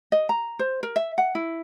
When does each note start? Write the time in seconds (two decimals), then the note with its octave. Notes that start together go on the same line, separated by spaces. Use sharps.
0.12 D#5
0.29 A#5
0.59 C5
0.83 A#4
0.96 E5
1.18 F#5
1.35 E4